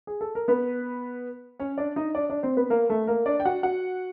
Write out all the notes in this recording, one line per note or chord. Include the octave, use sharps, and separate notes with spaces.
G#4
A4
A#4
B3 B4
C#4 C#5
D4 D5
D#4 D#5
D4 D5
D4 D5
C4 C5
B3 B4
A#3 A#4
A3 A4
A#3 A#4
D4 D5
G5
F#4 F#5
F#4 F#5